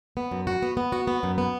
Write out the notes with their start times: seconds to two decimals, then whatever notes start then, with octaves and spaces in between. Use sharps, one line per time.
0.17 B3
0.31 F#2
0.47 F#4
0.62 B3
0.77 B3
0.92 F#4
1.07 B3
1.23 F#2
1.38 B3